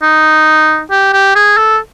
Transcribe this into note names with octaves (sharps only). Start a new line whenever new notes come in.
D#4
G4
G4
G#4
A4